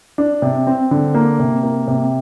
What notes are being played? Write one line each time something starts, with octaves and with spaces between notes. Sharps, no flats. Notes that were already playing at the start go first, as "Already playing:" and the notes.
D4
C3
C4
D3
A#3
C3
A#3
C3